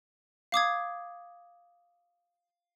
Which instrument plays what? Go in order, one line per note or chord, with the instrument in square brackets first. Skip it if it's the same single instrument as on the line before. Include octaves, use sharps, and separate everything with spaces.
[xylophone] F5 D6 D#6 G#6